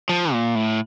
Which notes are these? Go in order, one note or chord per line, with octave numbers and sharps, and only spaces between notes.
F3
A#2
A2